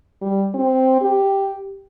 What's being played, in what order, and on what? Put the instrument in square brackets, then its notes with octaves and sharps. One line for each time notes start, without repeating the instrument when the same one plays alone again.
[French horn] G3
C4
G4